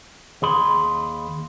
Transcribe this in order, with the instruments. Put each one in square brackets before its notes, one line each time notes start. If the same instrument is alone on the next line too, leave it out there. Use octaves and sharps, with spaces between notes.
[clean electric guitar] D#2 G#4 B5 C6